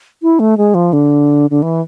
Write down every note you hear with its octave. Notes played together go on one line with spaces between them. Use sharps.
E4
A3
G#3
F3
D3
D3
E3